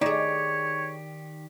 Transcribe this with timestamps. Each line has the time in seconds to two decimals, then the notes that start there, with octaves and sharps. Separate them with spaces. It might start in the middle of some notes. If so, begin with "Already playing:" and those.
0.01 D#3 D#4 G4 G#4 C#5 D5